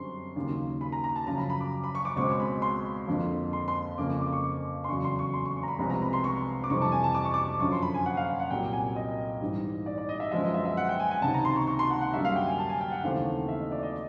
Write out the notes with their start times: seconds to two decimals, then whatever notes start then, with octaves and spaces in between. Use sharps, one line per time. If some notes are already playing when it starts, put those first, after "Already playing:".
Already playing: F#2 D3 G3 C4 C6 C#6
0.36 D#2 C#3 F#3 A#3
0.81 B5
0.92 A#5
1.04 A#5
1.16 A5
1.26 F#2 C#3 F3 A#5
1.38 B5
1.50 B5
1.61 D6
1.84 B5
1.95 C#6
2.05 D6
2.16 C#2 B2 G#3 C4 C#6
2.40 B5
2.62 C6
3.07 F2 D3 F3 A#3
3.53 C6
3.68 C6
3.98 F2 C#3 F3 A#3 D6
4.10 D6
4.20 D6
4.32 C#6
4.44 D6
4.84 C6
4.89 E2 C#3 F#3 C#6
5.04 C6
5.19 C#6
5.34 C6
5.45 C#6
5.56 C#6
5.63 A#5
5.68 B5
5.79 C2 C3 F3 G#3 B3 A#5
5.90 A#5
6.02 B5
6.13 C6
6.24 C#6
6.64 D6
6.69 F2 C3 E3 G3 C4 C#6
6.82 A5
6.92 G#5
7.04 A5
7.15 D6
7.25 C#6
7.34 D6
7.60 F#2 D3 F3 C#6
7.72 C6
7.82 B5
7.94 G#5
8.06 F#5
8.17 F5
8.28 F#5
8.40 F#5
8.51 C2 A#2 F#3 A#3 G5
8.73 G#5
8.96 D#5
9.41 G#2 E3 G3
9.86 D5
9.98 D5
10.09 D#5
10.20 E5
10.32 F#2 D3 F3 G#3 B3 E5
10.43 D#5
10.54 E5
10.65 E5
10.77 F#5
10.89 G5
11.00 G#5
11.11 G#5
11.22 C#2 C3 D#3 A5
11.34 A#5
11.45 C6
11.56 C#6
11.67 C#6
11.79 C6
11.90 F#5
12.01 F#5
12.14 F#2 D3 G3 A#3 E5
12.25 F5
12.36 G5
12.47 G#5
12.59 A5
12.69 G#5
12.81 G5
12.92 F#5
13.03 D#2 C#3 E3 A3 C4 F5
13.48 E5
13.60 D#5
13.72 D5
13.83 D#5